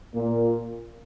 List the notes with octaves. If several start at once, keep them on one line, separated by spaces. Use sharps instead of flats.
A#2